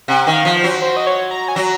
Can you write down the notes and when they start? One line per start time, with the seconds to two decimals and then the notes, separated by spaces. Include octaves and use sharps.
0.08 C3 F#5
0.27 D#3
0.33 F5
0.45 F3
0.57 C5
0.64 F#3
0.82 C5
0.97 D#5
1.07 C#5
1.31 A#5
1.48 G#5
1.55 F#3 A#5